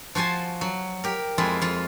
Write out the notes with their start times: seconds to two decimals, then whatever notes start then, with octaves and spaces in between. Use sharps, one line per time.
0.15 F3 F#4 C5 G#5 A5
0.61 F#3
1.04 G4 A#4
1.38 F2 G#3 E4 F4
1.62 F2 F4